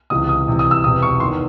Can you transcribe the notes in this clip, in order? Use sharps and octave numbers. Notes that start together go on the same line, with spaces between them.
C#2 C3 E3 D#6
D#6
C2 C3 E3
D#6
E6
E1 E2 C3 E3 D#6
C#6
E2 D#3 C6